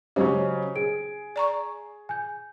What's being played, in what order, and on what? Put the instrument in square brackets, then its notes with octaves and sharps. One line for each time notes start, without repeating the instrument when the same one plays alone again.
[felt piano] C#3 F#3 C#4 [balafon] G4 [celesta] C5 C#5 D#5
[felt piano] G#4 [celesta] D7
[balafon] D5 A#5 C#6
[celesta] G#5 G6